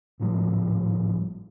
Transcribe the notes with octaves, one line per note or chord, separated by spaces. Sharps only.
G#1 A2 F3 G3